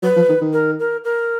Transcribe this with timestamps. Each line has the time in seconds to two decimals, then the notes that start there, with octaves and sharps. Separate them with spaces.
0.03 F#3 B4
0.16 F3
0.29 D#3
0.41 D#3
0.53 A#4
0.79 A#4
1.04 A#4